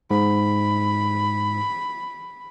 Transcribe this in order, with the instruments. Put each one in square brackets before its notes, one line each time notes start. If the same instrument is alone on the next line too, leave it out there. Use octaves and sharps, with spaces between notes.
[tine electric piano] G#2 [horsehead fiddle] B5